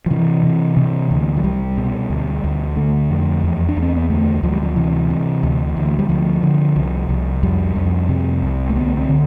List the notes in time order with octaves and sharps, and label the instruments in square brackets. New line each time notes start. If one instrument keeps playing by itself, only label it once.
[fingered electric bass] F3
C3 E3
C3
C3
D2
F3
C2 G3
B2
D2
D2
D3 A3
F2
E2
D4
E2
C4
B3
D2 A3
D2 F3
G3
F3
C3 E3
C3
D2
D2
G3
D2 F3
D3
C2
C2
F2 G3
F2
C3
C2
A3
D2 B3
C4
D3